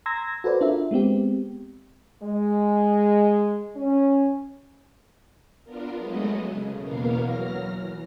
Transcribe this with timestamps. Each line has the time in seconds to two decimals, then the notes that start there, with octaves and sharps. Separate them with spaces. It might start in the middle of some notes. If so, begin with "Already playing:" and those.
0.06 A#5 C6 E6 G#6 A#6
0.44 F#4 A4 B4 C5 D5
0.61 D4 F4 A#4 E5
0.91 G#3 B3 C4 G4
2.22 G#3
3.75 C#4
5.64 B3 D4 F4 A#4
5.97 F#3 G#3 A3 B3 D#5
6.43 C#3
6.79 E2 B2 A#3 B3 A#4 F5
7.16 F#3 F6 A#6
7.66 E3